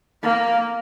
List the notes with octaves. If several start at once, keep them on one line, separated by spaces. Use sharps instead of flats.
A#3